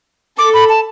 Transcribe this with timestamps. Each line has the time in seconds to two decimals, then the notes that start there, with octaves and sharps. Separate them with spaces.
0.38 A4 D6
0.54 B5
0.69 A5